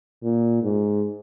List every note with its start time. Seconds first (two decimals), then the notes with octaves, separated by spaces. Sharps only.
0.23 A#2
0.63 G#2